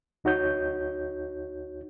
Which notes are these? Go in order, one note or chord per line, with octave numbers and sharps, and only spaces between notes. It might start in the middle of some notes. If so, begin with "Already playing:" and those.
D2 D#4 F#4 C#5 G6